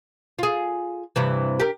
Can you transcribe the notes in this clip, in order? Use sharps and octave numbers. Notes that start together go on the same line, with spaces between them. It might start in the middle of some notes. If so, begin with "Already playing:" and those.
F4 G#4
G2 C3 E3
G4 A#4